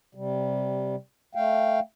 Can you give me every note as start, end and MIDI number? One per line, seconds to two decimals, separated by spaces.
0.15 0.96 48
0.15 0.96 55
1.35 1.80 57
1.35 1.80 77
1.35 1.80 79